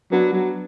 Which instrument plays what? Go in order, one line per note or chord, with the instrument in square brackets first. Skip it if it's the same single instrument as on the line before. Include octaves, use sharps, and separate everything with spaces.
[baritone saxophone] F#3 [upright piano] B3 D4
[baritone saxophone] F#3